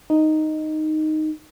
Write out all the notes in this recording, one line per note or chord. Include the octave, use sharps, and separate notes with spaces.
D#4